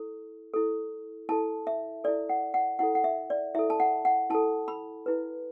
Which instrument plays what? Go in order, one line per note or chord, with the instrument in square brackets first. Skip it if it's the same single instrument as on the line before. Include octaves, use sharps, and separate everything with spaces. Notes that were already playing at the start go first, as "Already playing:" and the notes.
Already playing: [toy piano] E4 A4
E4 A4
E4 A4 A5
E5
E4 A4 D5
F#5
F#5
E4 A4 F#5
F#5
E5
D5
E4 A4 E5
A5
F#5
F#5
E4 A4 A5
B5
E4 B4